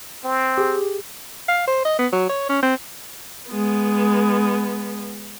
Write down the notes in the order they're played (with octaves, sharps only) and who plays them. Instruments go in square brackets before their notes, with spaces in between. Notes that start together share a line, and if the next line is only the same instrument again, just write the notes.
[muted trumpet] C4
[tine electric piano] G4 G#4
[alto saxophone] F5
C5
D#5
B3
F#3
C#5
C#4
C4
[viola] G#3 B3